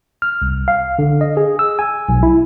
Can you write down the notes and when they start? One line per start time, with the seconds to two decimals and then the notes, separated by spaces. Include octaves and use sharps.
0.22 F6
0.42 C2
0.68 F5
0.99 D3
1.21 D#5
1.37 G#4
1.59 E6
1.79 G#5
2.09 B1
2.23 E4